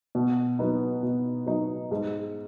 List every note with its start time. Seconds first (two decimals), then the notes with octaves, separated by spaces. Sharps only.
0.15 B2
0.59 F#3 B3 D#4
1.03 B2
1.47 F#3 B3 D#4
1.91 G#2